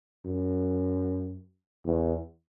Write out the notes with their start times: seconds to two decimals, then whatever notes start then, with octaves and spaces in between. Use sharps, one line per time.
0.25 F#2
1.85 E2